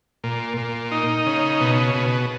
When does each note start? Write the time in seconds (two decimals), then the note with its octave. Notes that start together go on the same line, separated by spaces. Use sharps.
0.24 A#2
0.57 A#2
0.92 D#4
1.26 C#3
1.61 B2
1.95 B2